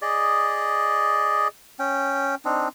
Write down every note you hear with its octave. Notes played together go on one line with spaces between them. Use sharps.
G#4 D5 D#5
C#4 G5
C4 D4 D#4